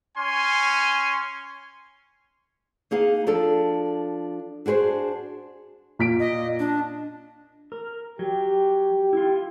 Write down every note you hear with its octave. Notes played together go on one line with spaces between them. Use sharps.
C#4 G#5 C6
A#3 D#4 G#4 F5
F3 D4 A4
D4 F#4 G#4 B4 C5
A#2 B6 D7
D#5
D4
A#4
F#3 G4
E4 F4